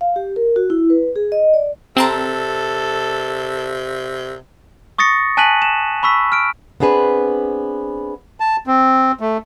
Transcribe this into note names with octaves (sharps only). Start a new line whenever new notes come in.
F5
G4
A#4
F#4
E4
B4
G#4
D#5
D5
C3 C4 A4 A5 A#5
C#6 D#6 A6 A#6 C#7
G#5 A5 F#6 B6 D#7 F#7
E7
B5 C#6 E6 B6
F6 D7
B3 C4 D4 G#4 B4
A5
C4
A3